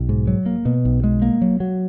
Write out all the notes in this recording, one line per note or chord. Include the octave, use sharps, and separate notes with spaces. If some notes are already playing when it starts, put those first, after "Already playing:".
Already playing: B1
G#2
F#3
A#3
B2
B1
G#3
A#3
F#3
F#3